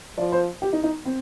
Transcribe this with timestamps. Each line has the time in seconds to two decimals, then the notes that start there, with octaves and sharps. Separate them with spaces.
0.18 F3 D5
0.32 C5
0.62 G4
0.73 D#4
0.84 D#4
1.06 C4